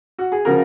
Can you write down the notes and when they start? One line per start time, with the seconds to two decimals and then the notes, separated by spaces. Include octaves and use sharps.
0.19 F#4
0.32 G#4
0.45 C#3 F3 F#4 A#4